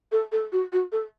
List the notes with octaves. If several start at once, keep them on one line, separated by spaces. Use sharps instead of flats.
A4
A4
F#4
F#4
A4